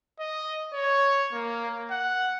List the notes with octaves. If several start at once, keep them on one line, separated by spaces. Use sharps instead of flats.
D#5
C#5
A#3
F#5